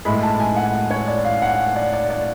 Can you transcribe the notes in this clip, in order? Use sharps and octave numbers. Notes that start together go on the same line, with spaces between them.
A2 G#3 B5
A5
G#5
F#5
C#5
D5
F5
F#5
D5
D5
D5